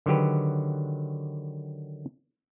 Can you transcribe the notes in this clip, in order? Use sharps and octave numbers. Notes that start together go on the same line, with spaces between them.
D3 D#3 F#3 G4 B4